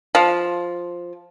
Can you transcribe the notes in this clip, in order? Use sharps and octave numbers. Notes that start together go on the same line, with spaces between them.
F3